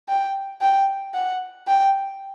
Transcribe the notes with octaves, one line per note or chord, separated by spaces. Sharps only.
G5
G5
F#5
G5